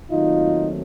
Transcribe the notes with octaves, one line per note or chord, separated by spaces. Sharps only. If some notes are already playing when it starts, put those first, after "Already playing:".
D#2 D#3 F#3 A3 C4 D#4 F4